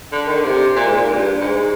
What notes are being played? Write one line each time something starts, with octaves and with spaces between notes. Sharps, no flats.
D3
D#3
D3
C3
A#2
G#2
A#2
G2
G#2